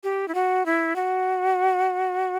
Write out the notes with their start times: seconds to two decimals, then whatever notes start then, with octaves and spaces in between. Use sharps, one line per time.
0.04 G4
0.28 E4
0.35 F#4
0.66 E4
0.96 F#4